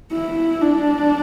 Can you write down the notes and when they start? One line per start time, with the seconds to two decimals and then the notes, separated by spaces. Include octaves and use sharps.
0.12 E4
0.62 D4